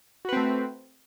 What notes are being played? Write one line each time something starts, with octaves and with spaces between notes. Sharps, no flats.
A3 C4 F#4 B4